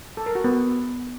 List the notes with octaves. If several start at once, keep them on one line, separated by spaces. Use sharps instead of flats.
A4
A#4
F#4
B3